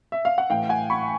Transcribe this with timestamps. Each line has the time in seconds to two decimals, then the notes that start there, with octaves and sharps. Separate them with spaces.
0.12 E5
0.25 F5
0.38 F#5
0.50 A2 E3 F5 G5
0.69 F#5 G#5
0.90 B5 C#6